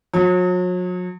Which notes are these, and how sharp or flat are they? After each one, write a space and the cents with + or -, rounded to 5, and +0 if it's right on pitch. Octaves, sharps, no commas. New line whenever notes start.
F#3 -40